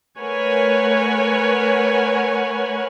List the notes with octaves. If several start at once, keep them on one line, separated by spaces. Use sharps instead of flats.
A3 A#4 B4 C#5 F#5 G#5